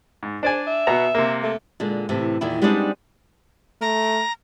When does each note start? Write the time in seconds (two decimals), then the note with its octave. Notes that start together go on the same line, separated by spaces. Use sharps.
0.23 G#2
0.43 D4 C5 D5 G#5
0.67 E5
0.87 B2 B3 A#5
1.15 C3 A#3
1.43 A3
1.80 A#2 D3 G#3
2.09 A2 C3 E3
2.41 E2 A#2 D#3 E4
2.62 G3 G#3 B3 C4 D4 D#4
3.81 A3 A#5